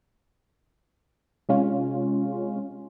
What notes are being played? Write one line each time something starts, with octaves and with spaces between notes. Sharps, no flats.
C3 G#3 C#4 F4